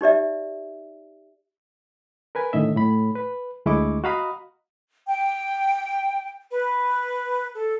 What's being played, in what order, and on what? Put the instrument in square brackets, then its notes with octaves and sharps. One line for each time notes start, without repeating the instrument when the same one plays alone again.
[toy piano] D#4 G4 D5 E5
[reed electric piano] A#4 B4 G#5
A2 D3 D#3 D#5 E5
A2 B5
B4
D2 G#3 E4 D#5 C#6 D6
F#4 D#5 F5 A#5 B5 D#6
[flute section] G5
B4
A4